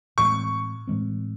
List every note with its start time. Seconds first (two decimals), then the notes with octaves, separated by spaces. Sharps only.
0.18 A2 E3 G#3 C4 C#6
0.87 A2 E3 G#3 C4